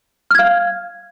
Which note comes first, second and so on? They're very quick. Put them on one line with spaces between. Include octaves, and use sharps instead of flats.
F6 G#6 F5